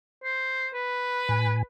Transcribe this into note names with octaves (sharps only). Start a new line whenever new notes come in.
C5
B4
A2 G#5